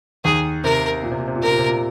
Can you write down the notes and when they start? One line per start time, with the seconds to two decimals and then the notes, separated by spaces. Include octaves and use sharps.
0.25 D#2 D#3 G#4
0.64 C3 A#4
1.03 A#2
1.12 C3
1.19 A#2
1.28 C3
1.35 A#2
1.42 C3 A#4
1.51 A#2
1.59 C3
1.67 A#2